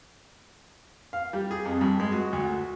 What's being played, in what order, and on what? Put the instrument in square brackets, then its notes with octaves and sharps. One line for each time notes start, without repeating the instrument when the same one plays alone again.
[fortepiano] F5
G3
G#4
F2
G2
G#3
F#4
D2
F#4